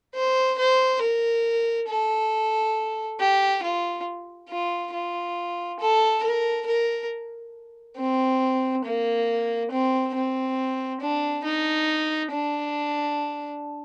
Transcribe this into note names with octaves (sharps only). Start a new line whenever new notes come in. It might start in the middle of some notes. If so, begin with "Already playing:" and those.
C5
C5
A#4
A4
G4
F4
F4
F4
A4
A#4
A#4
C4
A#3
C4
C4
D4
D#4
D4